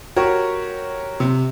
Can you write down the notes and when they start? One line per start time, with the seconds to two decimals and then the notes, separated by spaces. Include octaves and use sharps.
0.16 F#4 G4 A#4 C#5
1.20 C3